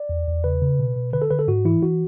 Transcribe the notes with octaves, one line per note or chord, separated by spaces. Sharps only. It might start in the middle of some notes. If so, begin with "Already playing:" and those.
Already playing: D5
E2
E2
C#3 B4
C#3
B2
B2
D3 B4
A4
D3 B4
A4
G#2 F#4
E3 E4
E3 F#4